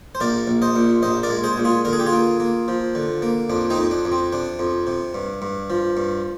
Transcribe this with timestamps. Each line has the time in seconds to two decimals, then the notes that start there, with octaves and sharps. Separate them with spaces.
0.15 C5
0.20 A#1 A#4 D5
0.48 A#1
0.62 C5 D#5
0.75 A#2
1.03 A#1 C5 D#5
1.23 A#4 D5
1.30 G#3
1.44 G#4 C5
1.58 A#2
1.65 F4 G#4
1.85 D3 A#4
1.93 G#4
1.99 G4
2.06 F4 G#4
2.13 A#3
2.40 A#3
2.68 F3
2.95 D3
3.22 A#3
3.50 F2 D4
3.70 C4 D#4
3.78 F2
3.91 D4
4.05 F2
4.12 C4
4.32 C3 D4
4.59 F2
4.87 C3
5.14 G2
5.42 G2
5.70 F3
5.97 G2